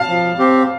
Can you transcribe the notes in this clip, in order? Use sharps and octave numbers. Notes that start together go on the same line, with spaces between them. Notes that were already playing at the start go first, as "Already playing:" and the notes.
Already playing: F5 A5
F3
C4 G4